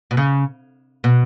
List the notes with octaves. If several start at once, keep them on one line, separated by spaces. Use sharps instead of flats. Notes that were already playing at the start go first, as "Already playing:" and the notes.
B2
C#3
B2